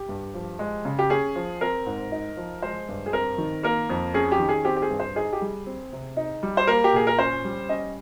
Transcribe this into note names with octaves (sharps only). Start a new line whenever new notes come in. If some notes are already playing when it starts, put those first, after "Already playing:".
Already playing: G4
G2
F3
G#3
C#3
G4
C#4 G#4
F3
C4 A#4
G#2
D#4
F3
G#3 C5
G2
G#4
C4 A#4
D#3
A#3 A#4
F2
C#4 G#4
G4
D#3
G#4
C4 G4
G4
G#4
G2
C5
D#4 G#4
G4
G3 G#4
C4
C3
D#4
G3
C5
A#3 A#4
G4
A#2 G#4
A#4
C#4 C5
G3
C#4 D#5